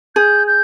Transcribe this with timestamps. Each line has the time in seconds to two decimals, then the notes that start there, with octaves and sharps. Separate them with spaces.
0.16 G#4 G6
0.47 G6